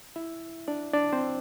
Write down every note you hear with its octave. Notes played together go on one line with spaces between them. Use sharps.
E4 E5
D4 D5
D4 D5
C4 C5